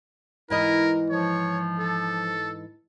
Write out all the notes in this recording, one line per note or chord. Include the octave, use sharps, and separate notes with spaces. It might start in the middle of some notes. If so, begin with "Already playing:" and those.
G#2 E3 E4 A#4 D#5
F3 C#5
A4